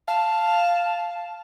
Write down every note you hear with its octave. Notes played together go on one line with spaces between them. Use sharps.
F5 A5